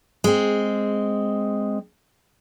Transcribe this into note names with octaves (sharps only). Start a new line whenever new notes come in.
G#3 C4